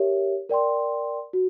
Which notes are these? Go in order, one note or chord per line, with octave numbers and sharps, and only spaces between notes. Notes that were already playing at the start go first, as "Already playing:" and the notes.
Already playing: G4 A#4 C#5 E5
A#4 D5 G5 C6
F#4